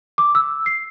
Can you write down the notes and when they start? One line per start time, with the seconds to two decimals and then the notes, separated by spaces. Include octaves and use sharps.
0.18 D6
0.35 E6
0.66 C7